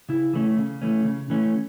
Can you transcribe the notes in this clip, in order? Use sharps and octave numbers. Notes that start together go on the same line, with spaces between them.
C#3 E4
E3 A3 C#4
C#3
E3 A3 C#4
C#3
E3 A3 C#4